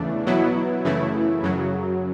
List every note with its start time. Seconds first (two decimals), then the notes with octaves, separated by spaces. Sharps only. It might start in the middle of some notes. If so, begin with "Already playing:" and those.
Already playing: E2 C#3 E3 A3 D4
0.27 B2 F#3 B3 E4
0.85 F#2 C#3 E3 A3 E4
1.43 F#2 C#3 F#3